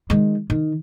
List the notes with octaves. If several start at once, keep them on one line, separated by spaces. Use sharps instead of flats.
D#3 G#3
D#3